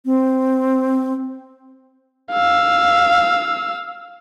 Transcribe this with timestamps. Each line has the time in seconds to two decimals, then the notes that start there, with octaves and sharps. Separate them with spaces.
0.06 C4
2.32 F5 E6